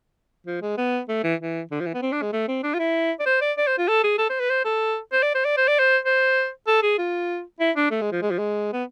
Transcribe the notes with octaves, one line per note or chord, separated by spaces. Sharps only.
F3
G#3
B3
A3
E3
E3
D3
F3
E3
B3
C4
D4
G#3
A3
C4
D4
F4
E4
D5
C5
D5
D5
C5
F4
A4
G#4
A4
C5
B4
C5
A4
C5
D5
C5
D5
C5
D5
C5
C5
A4
G#4
F4
E4
D4
A3
G#3
F3
G#3
F3
G#3
B3